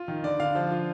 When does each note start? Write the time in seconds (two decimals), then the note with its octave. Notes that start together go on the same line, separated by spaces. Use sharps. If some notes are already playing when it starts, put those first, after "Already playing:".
Already playing: F4
0.08 D#3
0.23 D3 D5
0.40 D3 F5
0.55 F3
0.71 F4